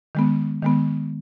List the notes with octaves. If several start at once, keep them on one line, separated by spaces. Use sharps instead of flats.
D#3 G#3 B3
D#3 G#3 B3